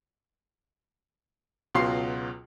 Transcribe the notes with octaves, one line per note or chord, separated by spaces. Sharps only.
C#2 B2 F#3 F4 C6 C7